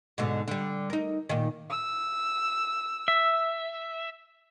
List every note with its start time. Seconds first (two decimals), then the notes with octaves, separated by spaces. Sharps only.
0.18 G#2 B2 D3
0.48 D3 G3
0.90 D#4 A#4
1.29 A#2 D#3
1.70 E6
3.08 E5